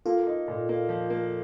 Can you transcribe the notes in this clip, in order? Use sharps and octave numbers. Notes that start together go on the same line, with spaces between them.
A#3 F4 A4
D#4
A#2
A#3
F3
A#3